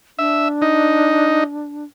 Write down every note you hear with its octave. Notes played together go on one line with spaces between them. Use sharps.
D4 E5
D#4